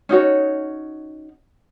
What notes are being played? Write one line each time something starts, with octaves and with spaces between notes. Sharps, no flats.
C#4 D#4 F#4 C#5